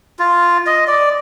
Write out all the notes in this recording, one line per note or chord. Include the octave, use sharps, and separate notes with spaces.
F4
D#5
D5